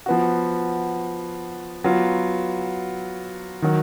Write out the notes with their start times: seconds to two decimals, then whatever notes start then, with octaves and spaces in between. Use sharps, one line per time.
0.06 F3 B3 F#4
1.84 F#3 B3 F4
3.62 D#3 F#3